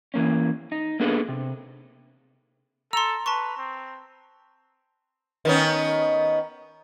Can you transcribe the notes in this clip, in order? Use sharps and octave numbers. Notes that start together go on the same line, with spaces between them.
E3 A#3 C#4
D#4
A#3 B3 D4 G#4 A4 B4
C3
A4 A#5 C6 E6
B4 A5 C6 C#6
C4
D#3 B3 C#4